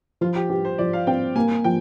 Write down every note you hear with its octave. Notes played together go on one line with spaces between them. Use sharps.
F3 F4
G4
G4
C5
F3 D5
F5
C4 G5
A#3 G#5
F3 G5